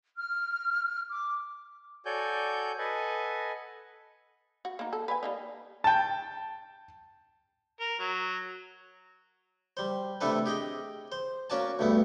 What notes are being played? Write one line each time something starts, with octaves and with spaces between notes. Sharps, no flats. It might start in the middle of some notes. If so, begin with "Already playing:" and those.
F6
D6
F#4 A4 C#5 D5 G#5 G6
A4 B4 D#5 F#5 G#5
F#4
A#3 D#4
A4
B4 C#5 G#5
G3 A#3 D#4
G5 A5
A#4
F#3
G3 C5
C3 E3 A3 D4 A4 B4
G4 G#4 D#5 G5
C5
A#3 C#4 F#4 D5 G#5 A5
D2 G2 A3 B3